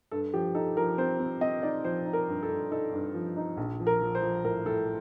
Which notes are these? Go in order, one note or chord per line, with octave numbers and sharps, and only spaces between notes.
G2 A4
F3 G4
D#4 A4
F3 A#4
C4 C5
C4
C4 D#5
D#4 D5
F3 C5
D#4
A#4
G2
A4
G2
D#4 A4
G2
F3
D#4
A#1
F3
A#4
F3
C5
F3
A2 A#4
A2 A4